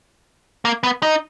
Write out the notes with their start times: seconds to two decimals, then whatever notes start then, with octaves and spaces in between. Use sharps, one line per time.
0.65 A#3
0.83 B3
1.03 D#4